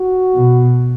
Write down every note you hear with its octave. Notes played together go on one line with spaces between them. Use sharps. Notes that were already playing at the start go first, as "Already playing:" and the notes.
Already playing: F#4
B2